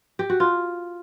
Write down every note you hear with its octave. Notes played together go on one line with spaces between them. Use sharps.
G4
F#4
F4